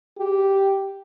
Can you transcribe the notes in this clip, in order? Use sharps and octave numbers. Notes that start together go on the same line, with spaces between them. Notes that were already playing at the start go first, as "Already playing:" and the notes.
G4